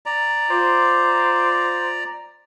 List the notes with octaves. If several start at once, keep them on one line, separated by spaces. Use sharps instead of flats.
D5 A#5
F4 C5 D6